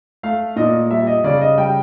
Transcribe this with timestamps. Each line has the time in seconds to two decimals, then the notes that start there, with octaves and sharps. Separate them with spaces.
0.23 A3 F5
0.56 A#2 D#5
0.91 G3 E5
1.07 D#5
1.24 C#3 D5
1.41 D#5
1.57 G3 G5